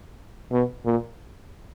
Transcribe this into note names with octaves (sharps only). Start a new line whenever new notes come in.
B2
A#2